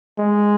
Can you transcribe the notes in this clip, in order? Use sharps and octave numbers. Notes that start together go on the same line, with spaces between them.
G#3